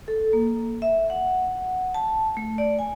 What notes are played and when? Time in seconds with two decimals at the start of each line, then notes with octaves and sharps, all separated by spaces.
0.08 A4
0.33 A#3
0.82 E5
1.10 F#5
1.94 A5
2.37 A3
2.58 D5
2.79 G#5